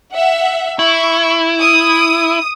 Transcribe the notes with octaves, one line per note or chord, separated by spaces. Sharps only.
E5 F#5
E4 C#6
D#6